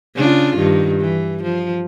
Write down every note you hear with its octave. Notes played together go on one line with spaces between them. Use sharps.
C#3 D4 F4
G2 D#3
E3
F3